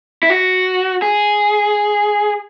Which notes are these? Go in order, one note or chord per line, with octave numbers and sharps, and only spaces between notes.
E4
F#4
G#4